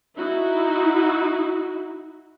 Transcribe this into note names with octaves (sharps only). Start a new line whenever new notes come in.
D#4 E4 F#4